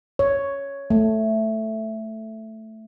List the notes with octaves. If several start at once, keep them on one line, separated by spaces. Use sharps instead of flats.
C#5
A3